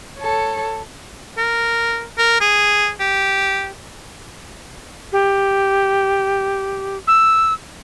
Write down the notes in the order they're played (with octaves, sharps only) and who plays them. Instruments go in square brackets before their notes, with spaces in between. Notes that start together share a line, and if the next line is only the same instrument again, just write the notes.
[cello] A4 C#5
[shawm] A#4
A#4
G#4
G4
[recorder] G4
E6